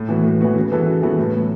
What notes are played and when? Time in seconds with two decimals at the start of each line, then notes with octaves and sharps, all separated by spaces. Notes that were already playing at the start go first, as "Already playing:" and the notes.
Already playing: A2
0.09 E3 B3 F#4
0.24 A2
0.41 E3 B3 F#4
0.56 C#3
0.72 E3 B3 F#4 A4
0.87 C#3
1.02 E3 B3 F#4 A4
1.18 A2
1.34 F#3 B3